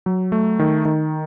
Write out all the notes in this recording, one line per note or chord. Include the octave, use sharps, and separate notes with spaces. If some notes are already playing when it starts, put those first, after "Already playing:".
F#3
A3
D#3
D#3